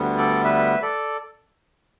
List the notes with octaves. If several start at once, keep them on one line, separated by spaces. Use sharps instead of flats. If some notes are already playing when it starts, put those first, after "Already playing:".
Already playing: D2 D3 G3 B3
A4 D5
B4 E5
A4 D5